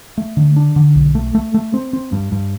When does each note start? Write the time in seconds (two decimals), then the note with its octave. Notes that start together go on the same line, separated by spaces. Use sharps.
0.18 A3
0.37 D3
0.56 D4
0.76 D3
0.95 B1
1.15 A3
1.35 A3
1.54 A3
1.74 C4
1.93 C4
2.12 G2
2.32 G2